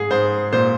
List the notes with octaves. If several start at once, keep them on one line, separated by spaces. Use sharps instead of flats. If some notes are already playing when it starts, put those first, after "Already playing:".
Already playing: G#2 G#4
G#2 C5
A#2 C5